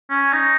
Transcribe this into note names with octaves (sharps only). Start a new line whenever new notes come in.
C#4
D#4